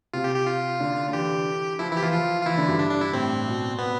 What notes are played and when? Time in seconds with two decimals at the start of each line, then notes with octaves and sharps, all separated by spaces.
0.13 C3 F4
0.24 G4
0.35 G4
0.47 F4
0.80 D3
1.08 D3
1.13 E3 G4
1.79 F3 E4
1.91 E3 E4
1.97 G4
2.02 E3 F4
2.13 F3 F4
2.42 F4
2.46 E3 E4
2.57 D3
2.68 G2
2.79 D4
2.91 D4
3.01 E4
3.13 A2 C4
3.46 B2
3.79 B3